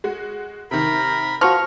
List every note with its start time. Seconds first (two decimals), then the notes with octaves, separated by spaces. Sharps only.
0.04 G#3 F#4
0.71 C3 D#3 A#4 B5
1.41 F3 F#4 C#6 F6 A#6